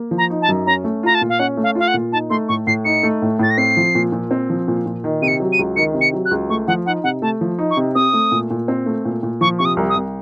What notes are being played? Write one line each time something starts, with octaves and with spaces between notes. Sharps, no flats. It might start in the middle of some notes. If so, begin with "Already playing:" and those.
Already playing: A#3
F3
A#5
D#4
A5
F#2
C#4 A#5
A3
F4 A#5
A5
A#2
F5
C#4 F#5
A3
F5
F4 F5
F#5
A#2
D#4 A5
A3 C6
A2 C#6
A2 C7
D#4 C#7
A3
A2
A2 A6
A#6
C4 C7
F3
A#2
A#2
C4
F3
A#2
A#2
D#3
C3 D#7
C#7
F#3
D#7
C#2
D#3 C#7
C3
C#7
F#3
F#6
C#2
A3 C#6
F3 F#5
D#4 F#5
C3 F#5
A3 A5
F3
D#4
C#6
C3
C4 D#6
A3
A#2
A#2
C4
A3
A#2
A#2
F3 C#6
C3 C#6
D#6
C2
D#6
C2